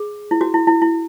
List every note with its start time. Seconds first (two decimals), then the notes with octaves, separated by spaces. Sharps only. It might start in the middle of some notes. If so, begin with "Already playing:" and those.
Already playing: G#4
0.31 E4
0.41 F#4
0.54 E4
0.67 E4
0.82 E4